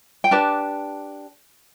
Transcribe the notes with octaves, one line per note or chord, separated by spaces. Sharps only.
G5
D4 G4 B4 A5